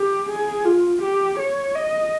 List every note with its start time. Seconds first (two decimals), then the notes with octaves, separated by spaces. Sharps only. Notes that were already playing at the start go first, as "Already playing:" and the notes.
Already playing: G4
0.29 G#4
0.65 F4
1.02 G4
1.39 C#5
1.75 D#5